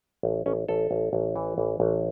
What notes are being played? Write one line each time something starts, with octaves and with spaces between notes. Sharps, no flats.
A1
A1 C#4
A1 A4
A1
A1
E3
A1
A1